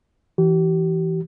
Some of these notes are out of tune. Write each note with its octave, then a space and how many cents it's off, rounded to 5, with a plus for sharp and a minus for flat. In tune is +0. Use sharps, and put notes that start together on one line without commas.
E3 +0 G4 -40